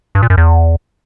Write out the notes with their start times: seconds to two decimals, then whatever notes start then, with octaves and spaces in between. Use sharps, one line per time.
0.15 G2
0.22 A#2
0.30 F#2
0.37 E2